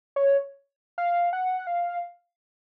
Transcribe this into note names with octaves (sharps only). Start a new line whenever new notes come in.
C#5
F5
F#5
F5